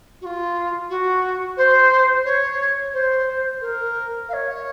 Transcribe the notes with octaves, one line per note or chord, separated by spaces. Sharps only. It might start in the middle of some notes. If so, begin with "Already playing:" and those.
F#4
F4
F#4
C5
C#5
C5
A#4
F5
C#5